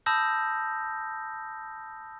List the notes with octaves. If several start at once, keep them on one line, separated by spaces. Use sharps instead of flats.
A5 B5 D#6 E6 G6 A#6